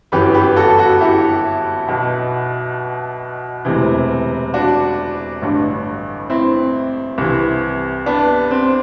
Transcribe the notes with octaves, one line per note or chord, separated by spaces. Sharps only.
G1 F#2 E3 G4 B4
G4 B4
F#4 A4
F#4 A4
E4 G4
B1 B2
E1 D2 C3 E3
D4 F#4
A1 G2 D3
C4 E4
C2 C3 E3
B3 D4
C4